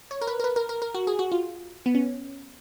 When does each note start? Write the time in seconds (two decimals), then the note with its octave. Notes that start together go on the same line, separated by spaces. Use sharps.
0.11 C#5
0.21 A#4
0.27 B4
0.40 A#4
0.44 B4
0.56 A#4
0.69 A#4
0.82 A#4
0.94 F#4
1.07 G#4
1.19 F#4
1.32 F4
1.86 B3
1.95 C#4